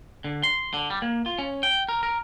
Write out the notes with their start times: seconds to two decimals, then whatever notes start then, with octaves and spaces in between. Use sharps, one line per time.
0.24 D3
0.43 C6
0.74 D3
0.90 G3
1.02 A#3
1.26 F4
1.38 C#4
1.63 G5
1.89 A#4
2.03 A#4